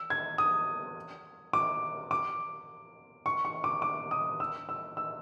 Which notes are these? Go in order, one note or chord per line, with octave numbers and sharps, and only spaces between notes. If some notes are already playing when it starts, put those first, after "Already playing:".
Already playing: E6
G#6
D#6
D6
D6
C#6
C#6
D6
D6
D#6
E6
E6
E6